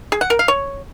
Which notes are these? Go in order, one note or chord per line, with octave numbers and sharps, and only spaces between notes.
G#4
F#5
A#4
F5
C#5